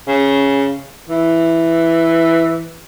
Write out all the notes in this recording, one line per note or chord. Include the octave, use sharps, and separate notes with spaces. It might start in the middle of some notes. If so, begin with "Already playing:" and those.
C#3
E3